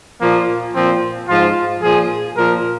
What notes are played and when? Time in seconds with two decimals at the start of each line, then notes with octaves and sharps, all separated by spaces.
0.21 A#2 F3 A#3
0.75 A#2 F3 C4
1.29 G#2 F3 F4
1.82 A#2 F3 G#4
2.36 A#2 F3 A#4